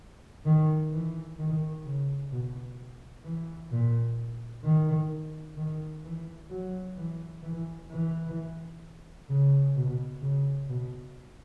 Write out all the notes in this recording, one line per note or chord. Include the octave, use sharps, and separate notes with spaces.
D#3
E3
D#3
C#3
B2
E3
A#2
D#3
D#3
E3
F#3
E3
E3
E3
C#3
B2
C#3
B2